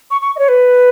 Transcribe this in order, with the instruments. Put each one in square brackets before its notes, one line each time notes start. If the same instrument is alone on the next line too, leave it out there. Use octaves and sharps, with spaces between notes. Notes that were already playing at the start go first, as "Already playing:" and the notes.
[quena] C#6
C#6
D#5
C#5
B4